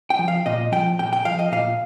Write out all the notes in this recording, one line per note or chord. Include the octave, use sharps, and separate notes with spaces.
G5
F3
F5
A#2 D#5
F3 G5
A#2 G5
G5
F3 F5
D#5
A#2 F5